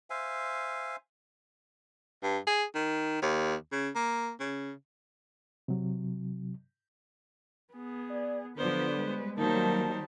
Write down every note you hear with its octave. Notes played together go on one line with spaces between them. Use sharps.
C5 E5 F5 G#5
G2
G#4
D#3
D#2
C#3
A#3
C#3
C3 F#3
B3 G#4
D5
D3 F3 F#3 B3 B4 C5 D5
G3 G#3
D#3 F#3 G3 A#3 D#4 C5 A5